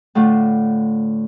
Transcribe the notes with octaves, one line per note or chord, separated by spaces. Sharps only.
A2 D3 A3 F4